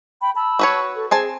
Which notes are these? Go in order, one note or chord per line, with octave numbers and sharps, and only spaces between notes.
G5 B5
A5 B5 E6
F#4 B4 C#5
A4
C4 G#4 G#5 A5